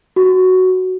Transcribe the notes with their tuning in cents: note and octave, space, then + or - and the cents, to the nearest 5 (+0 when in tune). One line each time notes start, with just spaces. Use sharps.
F#4 +5